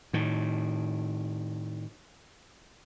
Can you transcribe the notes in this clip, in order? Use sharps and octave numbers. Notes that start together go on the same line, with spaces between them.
A2 D#3